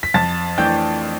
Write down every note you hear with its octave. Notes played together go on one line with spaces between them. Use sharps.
B6
F2 A5 A6
E3 A3 D4 G5 G6